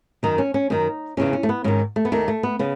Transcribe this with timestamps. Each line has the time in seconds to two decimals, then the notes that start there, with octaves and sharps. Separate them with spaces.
0.23 F#2 D#3 D#4
0.38 C#4
0.54 C#4
0.70 F#2 D#3 D#4
1.17 E2 C#3 E3 C#4
1.33 C#4
1.43 A3
1.49 B3
1.64 G#2 D#3 C#4
1.96 A3
2.05 B3
2.12 D#2 D#3 A3
2.28 A3
2.43 B3
2.59 C#3 B3